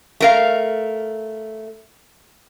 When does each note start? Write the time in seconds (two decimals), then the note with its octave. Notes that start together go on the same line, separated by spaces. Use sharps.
0.20 A3 A#4 F5